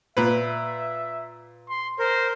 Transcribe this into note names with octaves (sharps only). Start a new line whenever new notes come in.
A#2 B4 E5
C6
A#4 C5